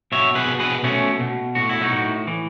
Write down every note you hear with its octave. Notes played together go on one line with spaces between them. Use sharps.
B2 C#5 E5
G#4 B4
B2
G#4 B4
B2 A3 C#4
B2
A2 F#4
E4
D#4 F#4
A2
E3